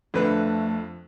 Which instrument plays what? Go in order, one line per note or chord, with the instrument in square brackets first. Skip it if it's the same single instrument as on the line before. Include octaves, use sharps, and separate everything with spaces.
[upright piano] F2 [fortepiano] D3 B4 F#6 [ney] A3